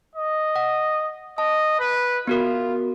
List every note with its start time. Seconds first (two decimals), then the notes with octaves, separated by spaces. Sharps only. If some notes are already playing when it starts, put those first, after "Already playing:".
0.16 D#5
0.56 F#5
1.38 D#5 A5
1.79 B4
2.27 B3 F4 F#4 A#4